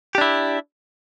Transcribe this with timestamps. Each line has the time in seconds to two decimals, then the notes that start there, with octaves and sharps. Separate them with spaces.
0.15 G4
0.18 D4
0.21 E4